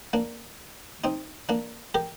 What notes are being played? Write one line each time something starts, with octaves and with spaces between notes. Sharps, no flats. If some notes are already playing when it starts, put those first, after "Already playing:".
A#3 D4
C4 D#4
A#3 D4
G4 A#4